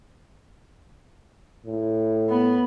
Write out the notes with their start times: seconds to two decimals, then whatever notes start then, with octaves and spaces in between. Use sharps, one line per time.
1.66 A2
2.30 B3